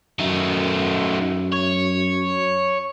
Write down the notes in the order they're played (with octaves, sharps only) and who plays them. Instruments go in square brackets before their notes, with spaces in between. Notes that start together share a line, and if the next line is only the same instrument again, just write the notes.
[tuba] F#2 [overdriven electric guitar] D#3 A3
[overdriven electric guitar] C#5